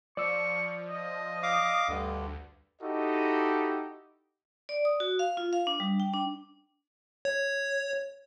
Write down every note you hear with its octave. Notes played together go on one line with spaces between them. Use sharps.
F3 D5 C#6 E6
D#5
F5 D6
D2 G2 D3
D#4 E4 F#4 G4 A4 D#5
D5
D#6
F#4
F5
F4
F5
D4
G3
G5
D4
C#5